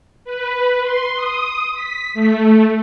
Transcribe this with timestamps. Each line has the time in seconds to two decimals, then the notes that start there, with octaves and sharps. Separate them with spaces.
0.25 B4
0.83 C6
1.16 D#6
1.74 B6
2.14 A3